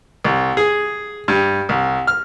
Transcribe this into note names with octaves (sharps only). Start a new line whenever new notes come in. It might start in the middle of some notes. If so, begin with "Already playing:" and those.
C2
G#4
G2
C2
F6